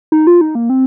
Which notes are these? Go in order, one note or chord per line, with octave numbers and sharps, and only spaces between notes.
D#4
F4
D#4
A#3
C4